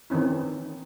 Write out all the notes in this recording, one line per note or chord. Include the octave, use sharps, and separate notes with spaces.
D#3 E3 C4 C#4 E4